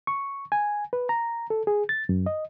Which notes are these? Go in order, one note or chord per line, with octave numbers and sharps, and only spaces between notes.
C#6
G#5
B4
A#5
A4
G#4
A6
F#2
D#5